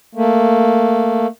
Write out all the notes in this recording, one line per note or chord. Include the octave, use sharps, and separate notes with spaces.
A3 A#3